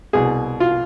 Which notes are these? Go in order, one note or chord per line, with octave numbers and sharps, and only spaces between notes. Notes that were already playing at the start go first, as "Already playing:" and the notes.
C2 B2 G#4
F4